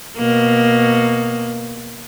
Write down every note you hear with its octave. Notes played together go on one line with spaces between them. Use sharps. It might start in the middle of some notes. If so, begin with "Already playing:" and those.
B2 A#3